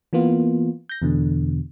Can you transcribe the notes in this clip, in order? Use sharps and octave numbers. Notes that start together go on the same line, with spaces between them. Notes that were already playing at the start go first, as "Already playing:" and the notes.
E3 A#3 B3 F4
G6 A#6
E2 B2 D3